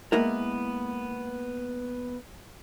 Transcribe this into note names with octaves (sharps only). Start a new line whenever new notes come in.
G#3 A#3 B3 E4 A#4